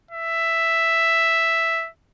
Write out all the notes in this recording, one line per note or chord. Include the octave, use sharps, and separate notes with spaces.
E5